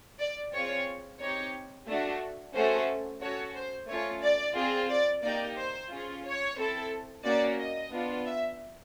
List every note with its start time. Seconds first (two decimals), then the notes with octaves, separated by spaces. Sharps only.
0.19 D5
0.53 C4 F4 G#4 C#5
1.19 C4 D#4 G4 C#5
1.88 A3 D4 F#4
2.54 A3 C#4 F#4 A4 C5
3.21 C#4 F#4 A4 C#5
3.55 C5
3.88 A3 C#4 F4 C#5
4.22 D5
4.55 C4 F4 G#4
4.89 D5
5.22 A#3 D#4 G4 D5
5.57 C5
5.90 C#4 F4 G#4
6.24 C#5
6.57 C4 E4 A4
7.24 A#3 C#4 F#4 D5
7.59 D#5
7.91 B3 D4 F4
8.26 E5